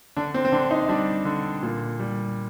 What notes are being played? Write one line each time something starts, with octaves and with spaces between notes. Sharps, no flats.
D3 D4
C4
C4
D3 D4
D#4
G3 D4
D3
A#2
G3